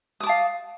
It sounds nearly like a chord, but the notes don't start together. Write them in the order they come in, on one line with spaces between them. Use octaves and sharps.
D#6 D6 A5 F5